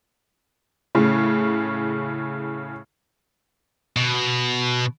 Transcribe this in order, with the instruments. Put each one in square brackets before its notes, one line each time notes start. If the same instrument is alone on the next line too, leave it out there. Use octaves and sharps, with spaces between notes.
[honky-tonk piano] A2 C#3
[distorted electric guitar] B2